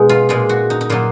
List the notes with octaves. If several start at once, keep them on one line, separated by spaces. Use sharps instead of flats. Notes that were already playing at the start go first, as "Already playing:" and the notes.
Already playing: B2 G#3 D#4
F4
A#2 G#3 F4
F#4
D#4
D#4
A#2 F#3 F4